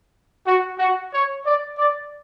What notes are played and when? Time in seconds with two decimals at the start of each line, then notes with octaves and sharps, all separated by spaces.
0.46 F#4
0.79 F#4
1.13 C#5
1.45 D5
1.78 D5